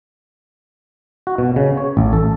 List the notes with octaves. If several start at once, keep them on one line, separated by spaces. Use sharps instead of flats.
F#4
B2
C#3
C#5
A1
A4